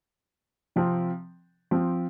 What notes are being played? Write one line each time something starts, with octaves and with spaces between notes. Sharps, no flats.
C3 F3 C4
F3 C4